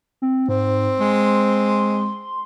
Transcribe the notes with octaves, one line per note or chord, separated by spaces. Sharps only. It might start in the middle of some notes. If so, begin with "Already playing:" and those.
C4
G#2 C4
G#3 C6